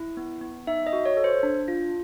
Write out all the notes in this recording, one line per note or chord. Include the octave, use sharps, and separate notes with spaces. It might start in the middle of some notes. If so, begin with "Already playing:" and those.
Already playing: E4
B3
B3
D#4 E5
D#5
F#4
C#5
A4
C5
D4
F4